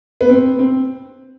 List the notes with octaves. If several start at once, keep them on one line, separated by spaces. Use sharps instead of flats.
B3
C4
C4